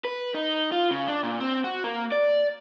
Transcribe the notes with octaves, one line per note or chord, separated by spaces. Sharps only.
B4
D#4
F4
C#3
D4
A#2
C4
F#4
A#3
D5